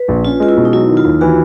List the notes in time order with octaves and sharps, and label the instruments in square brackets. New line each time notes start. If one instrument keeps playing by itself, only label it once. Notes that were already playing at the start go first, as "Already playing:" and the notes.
Already playing: [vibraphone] B4
[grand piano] A#1
[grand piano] C#4 [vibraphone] F4
[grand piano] G#3 [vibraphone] F4
[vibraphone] E4
[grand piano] B2
[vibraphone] D#4
[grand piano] F#3 [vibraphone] E4
[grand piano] D#3
[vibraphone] F4
[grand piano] D#2
[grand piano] E3 [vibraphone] F#4